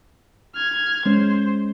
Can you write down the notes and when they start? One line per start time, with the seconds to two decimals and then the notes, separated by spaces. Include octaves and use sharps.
0.55 F6 G#6
1.06 G#3 C#4 C5